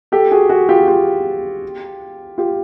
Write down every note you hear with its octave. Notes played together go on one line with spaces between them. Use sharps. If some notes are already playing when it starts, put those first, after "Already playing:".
G4 A4
F#4 G#4
F#4 G#4
F4 G4
F4 G4
F4 G4